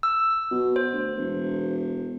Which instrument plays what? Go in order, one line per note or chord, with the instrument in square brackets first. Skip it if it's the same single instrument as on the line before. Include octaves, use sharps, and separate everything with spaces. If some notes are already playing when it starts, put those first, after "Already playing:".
[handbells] E6
[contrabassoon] B2
[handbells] C5
[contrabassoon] D2
E1